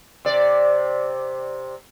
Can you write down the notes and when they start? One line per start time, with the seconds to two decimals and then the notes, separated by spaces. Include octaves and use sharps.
0.25 C3 D5